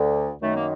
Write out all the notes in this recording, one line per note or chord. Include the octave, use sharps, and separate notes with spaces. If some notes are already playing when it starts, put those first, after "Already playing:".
Already playing: D2 D3
F#2 D#3 A3
A#3